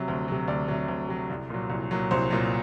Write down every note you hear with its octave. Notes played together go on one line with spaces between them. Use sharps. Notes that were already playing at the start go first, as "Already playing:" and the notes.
Already playing: C3 F#3
D2
C3 F#3
D2 D5
C3 F#3
D2
C3 F#3
C2
A#2 F#3
C2
A#2 F#3
C2 C5
A#2 F#3